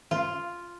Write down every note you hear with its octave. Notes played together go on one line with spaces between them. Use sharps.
F4